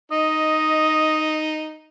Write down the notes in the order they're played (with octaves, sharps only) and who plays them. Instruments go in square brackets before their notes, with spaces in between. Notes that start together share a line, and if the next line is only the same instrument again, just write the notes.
[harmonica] D#4 [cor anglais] D#5